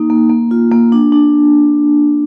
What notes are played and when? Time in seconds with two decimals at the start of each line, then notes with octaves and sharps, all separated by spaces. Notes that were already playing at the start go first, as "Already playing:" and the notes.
Already playing: A#3 D#4
0.10 A#3
0.30 A#3
0.51 F4
0.71 A#3
0.92 D4
1.12 D4